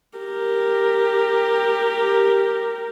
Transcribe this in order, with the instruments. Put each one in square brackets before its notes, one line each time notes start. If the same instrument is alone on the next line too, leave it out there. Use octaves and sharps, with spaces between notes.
[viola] G4 A#4